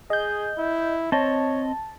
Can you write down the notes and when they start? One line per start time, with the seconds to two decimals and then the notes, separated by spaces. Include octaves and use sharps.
0.10 G#4 D#5 G6
0.58 E4
1.12 C4 C#5 D#5 A5